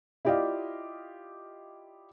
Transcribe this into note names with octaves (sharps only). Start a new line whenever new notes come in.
E4 F4 G4 D5 D#5 F5